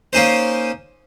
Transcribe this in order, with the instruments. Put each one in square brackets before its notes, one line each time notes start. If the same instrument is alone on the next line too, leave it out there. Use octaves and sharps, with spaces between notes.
[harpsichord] A#3 C#4 D#4 C5